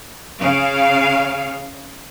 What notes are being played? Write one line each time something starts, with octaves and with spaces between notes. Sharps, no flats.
C#3 F5